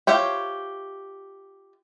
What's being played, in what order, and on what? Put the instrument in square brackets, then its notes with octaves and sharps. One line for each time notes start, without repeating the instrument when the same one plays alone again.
[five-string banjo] F4 G4 C5 C#5 E5